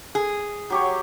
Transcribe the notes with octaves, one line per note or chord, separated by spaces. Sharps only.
G#4
F#3 G4 C#5